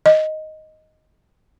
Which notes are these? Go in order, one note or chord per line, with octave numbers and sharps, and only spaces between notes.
D#5